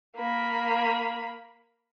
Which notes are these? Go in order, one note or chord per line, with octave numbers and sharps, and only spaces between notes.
A#3 B5